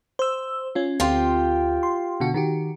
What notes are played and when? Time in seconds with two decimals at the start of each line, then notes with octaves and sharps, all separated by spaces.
0.19 C5 E6
0.75 C#4 F4
1.00 D2 C4 F4 G4 G5 C6
1.83 C6
2.20 B2 D3 F#4
2.34 D#3 F#4 G4